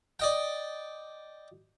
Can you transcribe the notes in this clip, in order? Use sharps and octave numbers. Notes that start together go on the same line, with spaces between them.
D5 D#5 G5